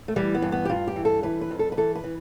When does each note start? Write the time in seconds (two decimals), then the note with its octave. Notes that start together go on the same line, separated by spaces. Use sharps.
0.08 A3
0.16 E3 G3
0.35 B3
0.42 G2
0.52 B3
0.65 G4
0.69 G2 F4
0.87 G4
0.96 E3
1.05 A4
1.23 E3 B4
1.41 B4
1.51 F2
1.59 A4
1.72 B4
1.77 E3 A4
1.95 B4
2.04 E3